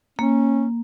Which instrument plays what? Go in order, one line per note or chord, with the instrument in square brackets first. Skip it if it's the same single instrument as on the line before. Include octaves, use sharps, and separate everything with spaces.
[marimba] A#3 [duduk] C#4